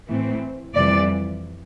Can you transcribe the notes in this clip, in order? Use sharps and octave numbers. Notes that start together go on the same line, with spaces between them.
A2 E3 A3 C4
F2 C3 E3 G3 D5